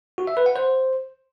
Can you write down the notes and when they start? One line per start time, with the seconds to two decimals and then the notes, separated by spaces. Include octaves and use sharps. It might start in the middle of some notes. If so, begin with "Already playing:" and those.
0.18 F#4
0.27 E5
0.37 B4
0.46 F#5
0.56 C5